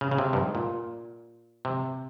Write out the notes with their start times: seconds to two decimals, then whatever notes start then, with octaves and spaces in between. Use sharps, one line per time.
0.01 C#3
0.11 C#3
0.18 C3
0.33 G2
0.37 G#2
0.55 A#2
1.65 C3